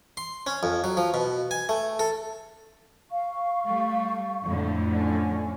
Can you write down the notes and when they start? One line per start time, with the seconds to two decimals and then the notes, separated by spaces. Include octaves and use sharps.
0.17 C6
0.47 C#4
0.63 F2
0.84 F#3
0.97 F3
1.14 B2
1.51 G#5
1.69 A3
1.99 A4
3.10 F5 C#6
3.68 G3 A3
4.45 F2 A2 D3
4.95 C#4